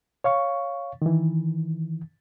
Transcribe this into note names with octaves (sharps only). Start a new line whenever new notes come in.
C#5 F5 C#6
D#3 E3